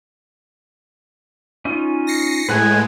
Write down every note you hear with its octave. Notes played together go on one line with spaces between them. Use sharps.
C#4 D#4 F4
A#6 C7 C#7
A2 G#3 B4 F#5 G#5